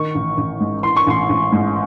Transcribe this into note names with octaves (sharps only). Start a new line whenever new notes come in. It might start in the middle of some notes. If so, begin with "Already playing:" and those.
Already playing: D#3 C#6
A1
A1
G#2
E3 C6
C#6
A1 C6
A1
G#2